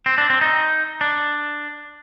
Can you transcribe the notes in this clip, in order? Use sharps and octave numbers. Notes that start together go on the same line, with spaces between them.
C4
D4
C4
D#4
D4